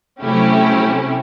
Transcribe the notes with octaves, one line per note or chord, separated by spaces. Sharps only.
C3 F#3 A3 C#4 E4 G4